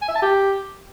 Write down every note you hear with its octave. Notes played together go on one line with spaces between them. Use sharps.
G#5
E5
A5
G4